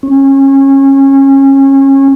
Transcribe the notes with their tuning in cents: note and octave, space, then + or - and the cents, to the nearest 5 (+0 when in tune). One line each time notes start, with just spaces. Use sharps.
C#4 -25